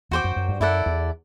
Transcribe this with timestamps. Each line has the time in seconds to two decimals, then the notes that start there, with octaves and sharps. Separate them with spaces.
0.11 E2 F#4 C5 G5 D6
0.24 F#2
0.36 F#2
0.48 G2
0.60 F#2 E4 A4 D5 F#5
0.86 E2